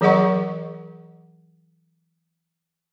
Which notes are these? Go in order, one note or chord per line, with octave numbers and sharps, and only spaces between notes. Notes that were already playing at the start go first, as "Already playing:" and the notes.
E3 F#3 G#4 D#5 F#5 C#6